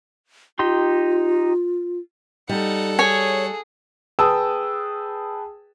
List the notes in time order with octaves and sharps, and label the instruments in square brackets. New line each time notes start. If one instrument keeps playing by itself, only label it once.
[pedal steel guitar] D#4 G4 C6 [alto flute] F4
[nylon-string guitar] G3 [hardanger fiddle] D#4 [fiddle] A4 F#5
[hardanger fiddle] G#4 [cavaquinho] C#5 G#5
[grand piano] G#4 B4 G5 A5 D#6 E6